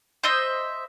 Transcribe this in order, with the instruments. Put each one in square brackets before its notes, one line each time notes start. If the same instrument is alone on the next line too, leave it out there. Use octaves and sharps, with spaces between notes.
[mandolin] C5 D#5 E5 C6